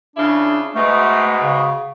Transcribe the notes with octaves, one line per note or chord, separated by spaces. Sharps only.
C#3 D4 E4 F4
G#2 B2 A3
C#3